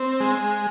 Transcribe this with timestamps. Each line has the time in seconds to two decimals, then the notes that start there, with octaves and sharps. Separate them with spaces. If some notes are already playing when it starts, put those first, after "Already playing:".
Already playing: C4
0.20 G#3